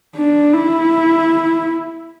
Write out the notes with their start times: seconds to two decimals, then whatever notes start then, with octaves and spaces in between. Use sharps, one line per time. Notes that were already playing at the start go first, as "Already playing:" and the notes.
0.16 D4
0.53 E4